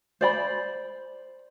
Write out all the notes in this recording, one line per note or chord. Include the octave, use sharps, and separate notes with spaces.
C5 D5 B5